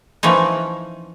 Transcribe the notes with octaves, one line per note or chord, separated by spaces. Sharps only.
E3 F3 C#4 D#4